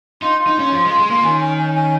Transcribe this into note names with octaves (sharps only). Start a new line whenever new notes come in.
D#4 F4
F4
D#4
C#4 F4
F3 F4
G#3 F4
G#3
A#3 F4
D#3 C#4
C#4
C#4
C#4